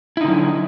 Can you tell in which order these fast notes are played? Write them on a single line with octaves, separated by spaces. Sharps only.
E4 D#4 D3 F#3